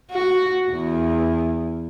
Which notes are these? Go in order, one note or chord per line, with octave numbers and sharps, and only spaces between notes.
F#4
E2